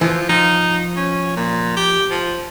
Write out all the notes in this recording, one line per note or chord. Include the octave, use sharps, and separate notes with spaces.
E3 F3
F3 D#4
C#4
A#2
G4
F3